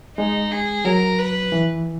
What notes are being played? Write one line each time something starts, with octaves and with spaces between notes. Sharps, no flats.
G#3 D#4
G#4
F#3 A#4
B4
E3